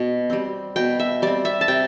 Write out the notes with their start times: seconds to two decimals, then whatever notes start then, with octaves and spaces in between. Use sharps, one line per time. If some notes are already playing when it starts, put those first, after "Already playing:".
Already playing: B2
0.30 G3 C4
0.76 B2 G5
1.00 E5
1.22 G3 C4 D5
1.45 E5
1.61 A5
1.68 C3 G5